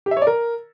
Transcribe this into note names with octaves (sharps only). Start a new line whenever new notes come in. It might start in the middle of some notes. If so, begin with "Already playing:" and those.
G4
E5
C#5
D5
A#4